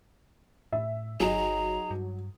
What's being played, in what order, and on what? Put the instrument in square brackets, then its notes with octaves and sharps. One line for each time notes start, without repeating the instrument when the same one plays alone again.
[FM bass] A2 [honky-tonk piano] E5
[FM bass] G1 [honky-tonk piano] F#3 [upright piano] D#4 G#4 [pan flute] A#5
[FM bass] G2